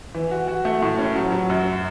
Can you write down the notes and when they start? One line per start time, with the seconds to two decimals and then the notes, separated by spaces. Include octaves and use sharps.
0.15 E3
0.31 F#4
0.48 F#4
0.65 A3
0.82 A2
0.99 C#4
1.16 F#3
1.32 F#3
1.50 F#2